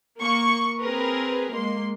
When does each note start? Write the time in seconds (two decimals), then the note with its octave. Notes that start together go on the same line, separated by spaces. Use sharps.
0.20 A#3 C#6
0.80 C4 G#4 A#4 B4
1.53 G#3 A#3 C6